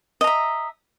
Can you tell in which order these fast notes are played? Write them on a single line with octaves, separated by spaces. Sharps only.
D#5 A#5 E5